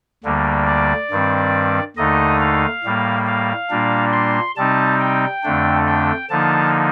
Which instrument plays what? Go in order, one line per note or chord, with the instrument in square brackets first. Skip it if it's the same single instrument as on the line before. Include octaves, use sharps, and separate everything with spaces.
[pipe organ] D2 D3 G3 A#3
D5
G2 D#3 G3 C4
D#2 D3 A3 D#4 D#5
F5
A2 G3 A#3
F5
A#2 G3 A#3 D4
C6
C3 G3 C4 D#4 A5
G5
F2 D3 A3 D4
G5
D3 F3 A#3 D#4 A5